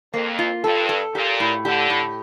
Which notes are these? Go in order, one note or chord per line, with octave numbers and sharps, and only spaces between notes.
F2 A#3
F4
G2 A4
A4
A#2 G4
A2
D3 G4
A2